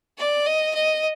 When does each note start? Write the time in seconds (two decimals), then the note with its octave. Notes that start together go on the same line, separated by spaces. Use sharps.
0.19 D5
0.46 D#5
0.75 D#5